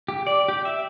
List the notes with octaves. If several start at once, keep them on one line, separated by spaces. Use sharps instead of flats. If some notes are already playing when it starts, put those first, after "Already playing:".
G4
D5
G4
E5